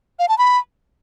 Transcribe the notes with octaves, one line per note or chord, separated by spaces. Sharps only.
F5
A5
B5